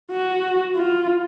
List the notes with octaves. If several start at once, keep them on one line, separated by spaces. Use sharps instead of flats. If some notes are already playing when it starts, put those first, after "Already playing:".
F#4
F4